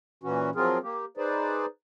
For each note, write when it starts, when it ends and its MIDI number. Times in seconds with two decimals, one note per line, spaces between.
0.23 0.50 46
0.23 0.50 52
0.23 0.50 61
0.23 0.50 66
0.55 0.78 53
0.55 0.78 54
0.55 0.78 60
0.55 0.78 65
0.55 0.78 68
0.55 0.78 70
0.83 1.05 58
0.83 1.05 67
1.17 1.66 63
1.17 1.66 68
1.17 1.66 71
1.17 1.66 72
1.17 1.66 74